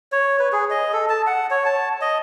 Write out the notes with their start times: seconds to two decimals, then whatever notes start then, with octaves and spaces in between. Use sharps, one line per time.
0.12 C#5
0.39 B4
0.53 G#4
0.70 D#5
0.93 A4
1.09 A5
1.27 F#5
1.51 C#5
1.65 A5
2.01 D#5